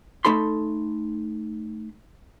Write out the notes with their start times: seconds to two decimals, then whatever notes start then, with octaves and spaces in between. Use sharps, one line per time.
0.25 A3 D#4 A4 B5 C6